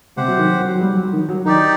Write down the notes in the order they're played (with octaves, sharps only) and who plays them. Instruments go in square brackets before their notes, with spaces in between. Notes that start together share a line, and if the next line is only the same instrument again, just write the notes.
[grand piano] C3 [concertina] G4 C5 F#5
[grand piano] F#3
D#3
F#3
F#3
G3
F#3
D#3
F#3
[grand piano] D#3 [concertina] D#4 G4 D5